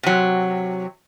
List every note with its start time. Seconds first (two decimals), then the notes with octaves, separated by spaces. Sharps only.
0.03 C3 F#3